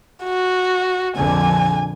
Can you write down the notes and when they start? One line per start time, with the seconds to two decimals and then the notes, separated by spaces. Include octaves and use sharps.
0.23 F#4
1.16 A#1 F2 D3 G#5